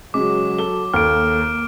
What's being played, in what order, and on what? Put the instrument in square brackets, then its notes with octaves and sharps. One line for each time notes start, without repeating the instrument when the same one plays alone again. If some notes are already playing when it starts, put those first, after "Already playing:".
[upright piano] C#3 G#3 [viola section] F#3 [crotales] D6
[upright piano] A4 G7
[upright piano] D#2 [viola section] A#3 [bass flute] A4 [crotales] F6 D7